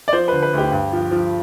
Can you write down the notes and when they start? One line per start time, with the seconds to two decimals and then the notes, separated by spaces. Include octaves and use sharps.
0.08 D5
0.13 F3 C5
0.28 D3 B4
0.43 B4
0.53 D2 G4
0.72 G2
0.92 F3
1.11 F3